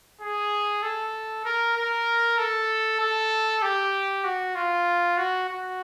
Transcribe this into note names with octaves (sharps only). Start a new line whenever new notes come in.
G#4
A4
A#4
A#4
A4
A4
G4
F#4
F4
F#4
F#4